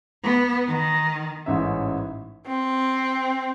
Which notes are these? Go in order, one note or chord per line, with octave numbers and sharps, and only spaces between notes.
B3
D#3
A1 G#2 C#4 E5
C4